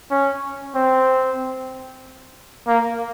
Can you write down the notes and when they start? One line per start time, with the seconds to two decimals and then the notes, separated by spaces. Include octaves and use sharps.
0.11 C#4
0.75 C4
2.67 A#3